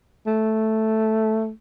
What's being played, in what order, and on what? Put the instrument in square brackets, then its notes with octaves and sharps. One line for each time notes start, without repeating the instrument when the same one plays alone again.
[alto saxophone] A3